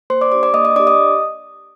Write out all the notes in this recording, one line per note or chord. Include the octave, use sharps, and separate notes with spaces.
A#3 C5 C6
D5 D6
D4 G4 D5 D6
D5 D6
A#3 D#5 D#6
D#5 D#6
D4 G4 D5 D6
D#5 D#6